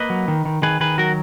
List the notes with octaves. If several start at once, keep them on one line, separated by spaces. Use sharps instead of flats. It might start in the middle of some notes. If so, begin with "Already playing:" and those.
Already playing: A#3 B4 D#5
F#3
D#3
D#3
D#3 G#4 B4
D#3 G#4 B4
F#3 F#4 A#4